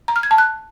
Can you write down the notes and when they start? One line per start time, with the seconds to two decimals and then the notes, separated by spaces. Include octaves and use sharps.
0.08 A#5
0.16 F6
0.23 G#6
0.31 A5
0.38 F#6